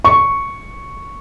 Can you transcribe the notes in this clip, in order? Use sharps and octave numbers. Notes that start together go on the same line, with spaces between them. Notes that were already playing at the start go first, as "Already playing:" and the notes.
C#6